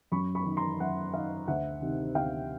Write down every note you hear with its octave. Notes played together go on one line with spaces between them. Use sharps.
F#2 B5 C#6
B5 C#6
D#3
A#5 C6
F#2 E5 F#5
D#3 D#5 F5
D2 E5 F#5
C3 D#3
D2 F5 G5